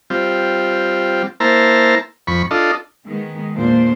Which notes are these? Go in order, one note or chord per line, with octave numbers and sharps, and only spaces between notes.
G3 C4 F4
A#3 E4 C5 A5 A#5
F2 B5 C#6
D4 F4 A4 D#5
D#3 G#3 B3
E2 A#2 A#3 D4 C5